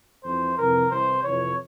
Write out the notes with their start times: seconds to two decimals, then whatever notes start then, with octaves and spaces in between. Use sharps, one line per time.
0.24 F2 E3 C5
0.57 F2 C3 E3 A#4
0.90 C2 C3 E3 C5
1.23 F2 C3 E3 C#5